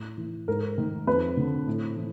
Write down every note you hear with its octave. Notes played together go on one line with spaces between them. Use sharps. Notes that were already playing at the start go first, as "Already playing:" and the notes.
Already playing: A2
E3
G#2 A#4
D#3
F2 B4
D3
A2
E3